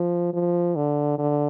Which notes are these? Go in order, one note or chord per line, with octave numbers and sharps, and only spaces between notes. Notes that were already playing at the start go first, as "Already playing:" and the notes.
Already playing: F3
F3
D3
D3